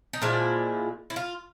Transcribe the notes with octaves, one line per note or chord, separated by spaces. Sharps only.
D#4
A#2 F3 G#3 E4
E4
F4